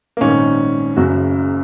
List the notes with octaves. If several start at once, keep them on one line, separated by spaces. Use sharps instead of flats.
A#3
A#1 G#2 D#3 C#4
F#1 F#2 C#3 F#4